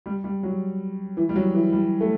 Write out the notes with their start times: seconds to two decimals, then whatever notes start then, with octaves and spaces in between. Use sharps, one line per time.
0.06 G3
0.24 G3
0.43 F#3
1.17 E3
1.29 G3
1.36 F#3
1.54 E3
1.72 G3
2.01 A3